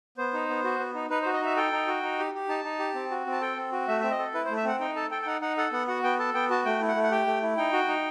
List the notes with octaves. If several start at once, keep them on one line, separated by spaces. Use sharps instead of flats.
B3 C5
D#4
B3
F#4
B3
D#4
D#4 B4
C5
F#4
D#5
D#4 E5
A4 G5
D#4
F#4
D#4
G4
G4
D#4 A5
D#4
G4
C4
F#4
C4
A5
A4 G5
C4
F#4
A3 E5
C4 E5
D#5
A4
E4 B4
C5
A3
E5
C4 F#5
D#4 G5
A4 A5
A4 G5
G5
D#4 F#5
D#4 F#5
A4 F#5
B3 F#5
F#4 F#5
B3 G5
A4 A5
B3 G5
F#4 A5
A3 G5
E4
F#5
A3
F#5
G4 G5
A3
E4
D#4 G5
F#4
D#4